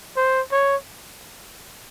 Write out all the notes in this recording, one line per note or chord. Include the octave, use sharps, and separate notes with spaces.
C5
C#5